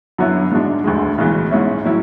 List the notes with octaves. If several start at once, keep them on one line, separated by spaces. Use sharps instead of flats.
F#2 D3 F#3 B3 E4
G#2 G#3 D4
E1 D2 D3 G#3
B1 A2 E3 G#3 B3
G#2 G#3 C#4 E4
A2 F#3 C#4 E4